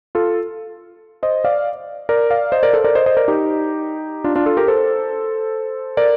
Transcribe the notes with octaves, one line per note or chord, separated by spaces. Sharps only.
F4 A4
C5 D#5
D5 F5
A#4 D5
D5 F5
C5 D#5
A#4 D5
A4 C5
A#4 D5
C5 D#5
C5 D#5
A#4 D5
D#4 G4
D4 F4
D4 F4
F4 A4
G4 A#4
A4 C5
A#4 D5